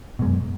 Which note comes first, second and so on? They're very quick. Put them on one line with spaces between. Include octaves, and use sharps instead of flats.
B2 G#3 F#2